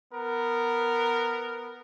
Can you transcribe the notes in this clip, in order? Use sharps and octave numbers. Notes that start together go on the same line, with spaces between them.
B3 A#4